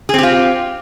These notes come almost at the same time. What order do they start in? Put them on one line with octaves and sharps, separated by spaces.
G#4 C4 G4 F4